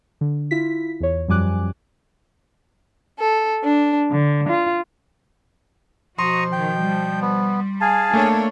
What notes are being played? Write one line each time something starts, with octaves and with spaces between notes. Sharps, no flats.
D3
E4 F4 B6
E2 C#5
F#2 F3 G3 G#5 D6 F#6
A4
D4
D3
F4
B2 F3 F#4 A#5 C6 C#6 D#6
D#3 G5
G3
B3
G#4 F5 G#5 A5
A3 A#3 D4 A4 C#5